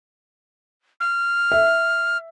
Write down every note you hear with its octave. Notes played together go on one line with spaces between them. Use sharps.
F6
E5